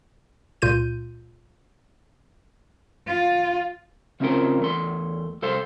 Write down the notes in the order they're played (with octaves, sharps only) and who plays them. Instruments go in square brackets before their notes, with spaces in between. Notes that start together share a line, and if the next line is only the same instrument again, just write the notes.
[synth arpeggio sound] C#2 A#2 F4 G6 D#7
[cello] F4
[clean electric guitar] C#3 C4 C#4 F4 A#4 C5
E2 A3 C6
C2 A4 C5 F5 C6